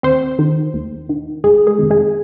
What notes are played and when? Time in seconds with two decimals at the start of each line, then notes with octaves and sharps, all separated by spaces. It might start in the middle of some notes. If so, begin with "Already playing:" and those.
0.03 D#2 C4 C5
0.39 D#3
0.74 D#2
1.09 D#3
1.44 G1 G#3 G#4
1.67 G#3 G#4
1.79 F2 C3 D#3
1.90 G#3 G#4